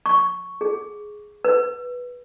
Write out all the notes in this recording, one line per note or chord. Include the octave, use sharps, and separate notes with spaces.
C#6
G#4
B4